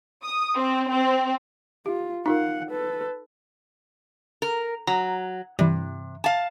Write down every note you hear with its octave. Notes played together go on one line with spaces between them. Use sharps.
D#6
C4
C4
F4 G4
D#4 F4 A#4 F5 F#5
A4 B4
A#4
F#3 A#5
G2 C3 E3
F5 A5